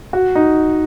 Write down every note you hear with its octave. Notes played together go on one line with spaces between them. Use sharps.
F#4
D#4